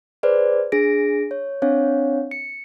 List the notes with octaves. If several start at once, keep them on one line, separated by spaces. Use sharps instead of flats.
G#4 B4 C5 D5
D4 G#4 A#6 D7
C#5
C4 D4 C#5 F5
C#7